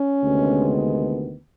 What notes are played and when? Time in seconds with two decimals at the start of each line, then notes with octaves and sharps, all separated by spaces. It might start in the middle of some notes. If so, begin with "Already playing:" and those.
Already playing: C#4
0.22 D2 C3 D#3 G#3 B3